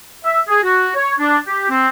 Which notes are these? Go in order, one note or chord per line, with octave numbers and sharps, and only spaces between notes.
E5
G#4
F#4
C#5
D4
G4
C4